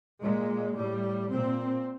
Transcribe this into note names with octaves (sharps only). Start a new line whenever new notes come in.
A#2 G#3
A2 G3
A#2 C4